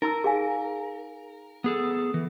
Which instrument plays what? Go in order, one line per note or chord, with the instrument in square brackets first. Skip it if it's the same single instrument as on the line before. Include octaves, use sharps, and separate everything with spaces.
[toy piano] D#4 A#5 E6 [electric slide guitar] A#4
[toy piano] G#4 F5 G#5
[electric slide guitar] B3 G#4 A4
E3